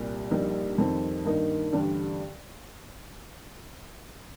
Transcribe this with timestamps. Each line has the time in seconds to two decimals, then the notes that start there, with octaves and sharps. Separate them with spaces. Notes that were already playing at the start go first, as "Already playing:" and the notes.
Already playing: C2 A#2 G3
0.31 A#1 A#2 G3 A#3 D#4
0.78 F2 D#3 G3 C4 D#4
1.25 G2 D#3 A#3 D#4
1.73 A1 G2 D3 G3 D4